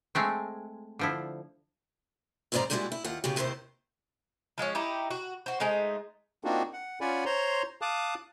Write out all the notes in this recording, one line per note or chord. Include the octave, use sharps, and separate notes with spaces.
G#3 A3 C4
D3 F3 E4
E2 G#2 C#3 C5 D5 A#5
A#2 G3 G#3 E4 F#4 D5
E4
D#2 F4 F#5
C#3 B3 F#4 G4
D#2 G#2 C3 D#3 E4 C5
F3 G#3 B3 C#4
D#4 E4 G4
F#4
F#4 C5
G#3 A3 D#4 C5
A#3 C4 D4 D#4 F4 F#4
F#5
C#4 F4 D5 F#5 G#5 B5
C5 C#5 A#5 C6
F5 A5 D6 D#6 F#6